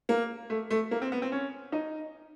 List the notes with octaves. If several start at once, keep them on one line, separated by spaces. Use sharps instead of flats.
A#3
A3
A3
A#3
C4
B3
C4
C#4
D#4